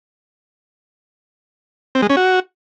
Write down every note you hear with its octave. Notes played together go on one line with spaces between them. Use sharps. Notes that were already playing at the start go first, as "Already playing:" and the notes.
C4
G#3
C#4
F#4